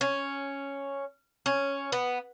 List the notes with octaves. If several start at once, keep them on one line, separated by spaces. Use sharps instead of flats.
C#4
C#4
B3